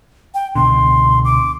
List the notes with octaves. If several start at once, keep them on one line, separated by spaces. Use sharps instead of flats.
G5
C#2 B2 D3 C6
D6